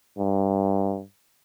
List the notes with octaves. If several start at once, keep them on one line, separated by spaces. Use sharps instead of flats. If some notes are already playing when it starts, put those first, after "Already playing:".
G2